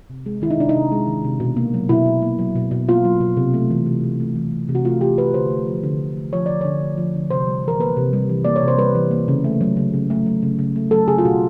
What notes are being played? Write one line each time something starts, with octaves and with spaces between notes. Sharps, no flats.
C3
G#3
D#3 E4
D#4
C3 D4
D#4
C3
G#3
D#3
C3
B2
A#3
F#3
B2 E4
B2
A#3
F#3
B2
B2
A#3 F4
F#3
B2
C3
A3
E3
C3
C3
A3
E3
C3
C3
F#4
A3 F4
E3 G4
C3 B4
D3 C5
A3
F3
D3
D3
A3
F3 C#5
D3 D5
D3 C#5
A3
F3
D3
C3 C5
G3
E3 A#4
A#3 B4
C3
G3
E3
A#3 D5
C#5
C3
C5
G3 B4
E3
A#3
C#3
A3
F#3
C#3
C#3
A3
F#3
C#3
C#3
A3
F#3 A4
C#3 G#4
F4
B2 F#4